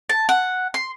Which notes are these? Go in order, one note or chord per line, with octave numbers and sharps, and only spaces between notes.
A5
F#5
C6